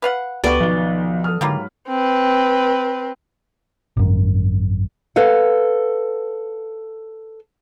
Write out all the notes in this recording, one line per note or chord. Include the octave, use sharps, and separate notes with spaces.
B4 F5 F#5
C#2 B3 D4 F#4 G4 A4 B4 D5
B1 D#3 F3 G7
A4 D#6 F6
G#2 D3 F#3 G3 A#3 F4 B5
C4 B4
G#1 F#2
A4 B4 F5 F#5